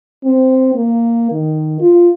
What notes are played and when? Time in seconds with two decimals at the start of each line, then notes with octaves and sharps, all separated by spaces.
0.24 C4
0.75 A#3
1.32 D#3
1.80 F4